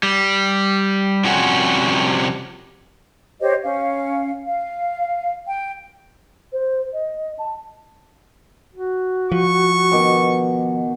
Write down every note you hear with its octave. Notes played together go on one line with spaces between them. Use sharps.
G3
C3 F3 G3 C#4 F#4
G4 C5 C#5 D#5
C#4 F5
F5
G5
C5
D#5
A5
F#4
F3 C#6
B2 D#3 D6